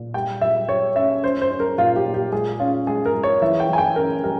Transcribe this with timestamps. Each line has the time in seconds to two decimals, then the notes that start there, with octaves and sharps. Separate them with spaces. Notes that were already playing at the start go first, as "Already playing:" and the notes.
Already playing: A#2
0.14 G3 G5
0.41 G3 E5
0.69 G3 C#5
0.96 C#4 E5
1.23 C#4 C5
1.41 C5
1.51 C#4
1.60 A#4
1.78 A#2 F4
1.96 G4
2.05 A#2
2.14 G4
2.32 G#3 G#4
2.60 C#4 F4
2.87 G#3 G#4
3.05 A#4
3.14 G#3
3.23 C#5
3.42 E3 E5
3.60 G5
3.69 E3 G#5
3.78 G5
3.96 C#4 A#4
4.23 G3 A#4